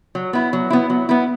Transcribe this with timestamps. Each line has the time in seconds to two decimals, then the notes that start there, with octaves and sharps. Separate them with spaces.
0.15 F#3
0.33 B3 E4
0.53 F#3
0.70 B3 E4
0.90 F#3
1.09 B3 E4